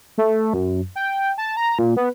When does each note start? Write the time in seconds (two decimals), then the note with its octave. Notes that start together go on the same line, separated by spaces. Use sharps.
0.18 A3
0.54 F#2
0.96 G5
1.38 A5
1.57 A#5
1.79 A#2
1.97 B3